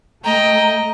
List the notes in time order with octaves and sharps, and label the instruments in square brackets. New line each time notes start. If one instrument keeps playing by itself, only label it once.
[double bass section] A3 [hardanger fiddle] D#5 G5 [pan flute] A#5